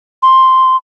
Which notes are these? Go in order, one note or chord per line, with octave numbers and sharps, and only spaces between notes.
C6